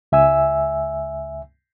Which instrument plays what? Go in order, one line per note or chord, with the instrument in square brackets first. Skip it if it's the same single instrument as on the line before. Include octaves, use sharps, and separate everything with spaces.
[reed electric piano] C#2 E5 G#5 E6